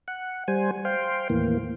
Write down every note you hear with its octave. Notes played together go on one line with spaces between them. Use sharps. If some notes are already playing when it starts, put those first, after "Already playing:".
F#5
G3 C5 G#5
C5 F5 G5
D#2 A2 E3 A#3